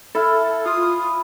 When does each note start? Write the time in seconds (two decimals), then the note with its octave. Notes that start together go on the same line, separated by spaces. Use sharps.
0.15 E4 A4 F5
0.66 F4 D#6